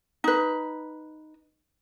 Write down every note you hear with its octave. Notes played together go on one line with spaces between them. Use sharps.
D#4 B4